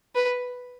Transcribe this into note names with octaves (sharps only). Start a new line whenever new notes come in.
B4